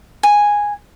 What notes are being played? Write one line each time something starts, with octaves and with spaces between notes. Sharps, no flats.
G#5